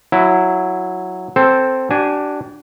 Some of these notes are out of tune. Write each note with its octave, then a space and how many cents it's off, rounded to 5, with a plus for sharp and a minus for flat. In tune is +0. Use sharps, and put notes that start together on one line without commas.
F#3 -5 E4 +5
C4 +0 A4 +0 C5 +0
D4 +0 G4 -45 G#5 +0